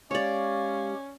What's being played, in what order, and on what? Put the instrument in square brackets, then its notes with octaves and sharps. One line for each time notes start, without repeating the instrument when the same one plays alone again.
[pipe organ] G#3 G4 [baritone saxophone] C#4 [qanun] C#5 D5 [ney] F5